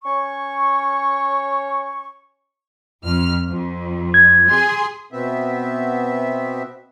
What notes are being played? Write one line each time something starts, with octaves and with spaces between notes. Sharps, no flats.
C#4 C#5 C#6
F2 F6
F2
G#6
G#4 C6
B2 B3 C4 E5